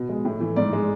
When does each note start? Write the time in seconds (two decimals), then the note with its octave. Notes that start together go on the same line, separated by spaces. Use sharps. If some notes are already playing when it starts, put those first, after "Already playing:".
Already playing: B2
0.09 G#3
0.25 A2
0.40 E3 A3
0.56 G#2 D5
0.73 G#3